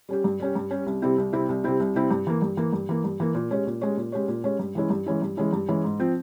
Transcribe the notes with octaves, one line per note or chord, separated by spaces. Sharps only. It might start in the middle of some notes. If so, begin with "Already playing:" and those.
G3 C#4 G4
G2
G3 C#4 G4
G2
G3 C#4 G4
C2
C3 G3 C4 E4
C2
C3 G3 C4 E4
C2
C3 G3 C4 E4
C2
C3 G3 C4 E4
G2
E3 A#3
G2
E3 A#3
G2
E3 A#3
G2
E3 A#3
A#2
G#3 C#4 G4 C#5
A#2
G#3 C#4 G4 C#5
A#2
G#3 C#4 G4 C#5
A#2
G#3 C#4 G4 C#5
G2
E3 G#3 C#4 E4
G2
E3 G#3 C#4 E4
G2
E3 G#3 C#4 E4
G2
E3 G#3 C#4 E4
G#2
F3 C4